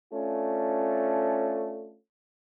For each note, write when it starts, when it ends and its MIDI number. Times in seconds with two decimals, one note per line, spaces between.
0.13 1.95 57
0.13 1.95 61
0.13 1.95 62
0.13 1.95 65